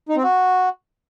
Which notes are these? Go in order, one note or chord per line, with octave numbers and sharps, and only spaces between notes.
D#4
C4
F#4